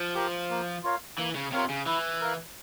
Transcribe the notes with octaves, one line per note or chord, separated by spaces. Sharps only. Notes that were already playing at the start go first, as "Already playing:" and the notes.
Already playing: F3
G4 A#4
A#3
F4 A#4 C#5 F5
E3 A#3
C#3
C3 F4 A#4 C#5 F5
C#3
E3 E4
A#4 F5